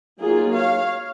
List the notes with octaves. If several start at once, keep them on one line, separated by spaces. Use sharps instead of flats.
F#3 A#3 D#4 F4 G#4
C#5 F5